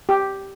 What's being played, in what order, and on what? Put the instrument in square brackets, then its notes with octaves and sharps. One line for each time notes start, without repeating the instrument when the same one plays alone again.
[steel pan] G4